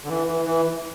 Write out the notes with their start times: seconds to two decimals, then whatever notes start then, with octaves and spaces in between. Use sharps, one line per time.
0.04 D3
0.09 E3
0.27 E3
0.45 E3